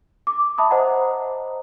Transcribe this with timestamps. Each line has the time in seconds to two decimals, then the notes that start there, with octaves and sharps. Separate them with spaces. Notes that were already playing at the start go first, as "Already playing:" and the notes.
0.27 D6
0.58 E5 A5 B5 D#6
0.70 C5 D#5 F#5 A#5